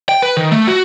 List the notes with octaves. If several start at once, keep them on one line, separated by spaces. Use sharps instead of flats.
G5
B4
D#3
A3
F#4